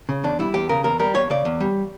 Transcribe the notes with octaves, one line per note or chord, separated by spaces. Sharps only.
C#3
E2 D4
G3 E4
E2 G4
C#3 A#4
E2 A#4
G3 A#4
E2 C#5
C#3 D5
E2
G3